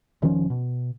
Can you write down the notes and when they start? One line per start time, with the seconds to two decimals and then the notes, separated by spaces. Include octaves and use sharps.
0.22 E1 D#3 F3 C#4
0.50 B2